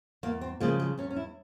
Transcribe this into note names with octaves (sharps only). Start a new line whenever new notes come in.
E2 A#3
C4
C#3 F3 G#3 A#3
G#3
E2 C#4
C#4
E4